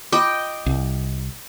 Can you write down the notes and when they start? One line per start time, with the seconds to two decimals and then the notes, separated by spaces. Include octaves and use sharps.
0.12 F4 D#5 G5 D6
0.66 C2